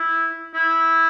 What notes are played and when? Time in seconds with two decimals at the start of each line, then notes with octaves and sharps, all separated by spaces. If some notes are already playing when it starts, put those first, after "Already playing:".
Already playing: E4
0.54 E4